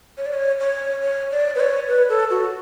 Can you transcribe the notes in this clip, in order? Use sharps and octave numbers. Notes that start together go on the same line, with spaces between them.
C#5
D5
C#5
C#5
C#5
D5
B4
C#5
B4
A4
F#4